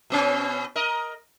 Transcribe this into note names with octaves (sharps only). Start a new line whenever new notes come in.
B2 B3 C#4
A#4 D#5